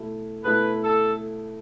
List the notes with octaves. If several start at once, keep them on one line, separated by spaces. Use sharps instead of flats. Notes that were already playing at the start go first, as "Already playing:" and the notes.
Already playing: B2 A3 E4
B2 A3 E4 B4
A4